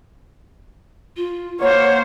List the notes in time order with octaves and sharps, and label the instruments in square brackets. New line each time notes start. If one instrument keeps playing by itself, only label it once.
[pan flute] F4
[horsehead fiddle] A#3 C5 [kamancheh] C#5 [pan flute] F#5